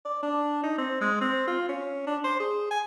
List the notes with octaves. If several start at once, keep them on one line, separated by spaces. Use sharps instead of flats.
D5
D4
D#4
C4
G#3
C4
F4
C#4
D4
C5
G#4
G#5